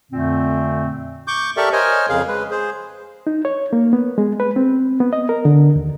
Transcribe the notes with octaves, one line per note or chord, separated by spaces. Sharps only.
F2 A#2 D3 A3 C4
C#6 D6 G6
G4 A4 A#4 D5 E5 C#6
A#4 C5 C#5 D#5 G#5
F2 C#3 G#4 F5
G#3 B4
G#4 C5
D#4
C#5
A#3
B3
G#3
B4
C4
B3
D#5
A#4
D3
D#2